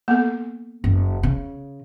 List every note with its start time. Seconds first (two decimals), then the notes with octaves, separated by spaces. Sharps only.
0.08 A#3 B3 A4
0.84 F#1
1.23 C#3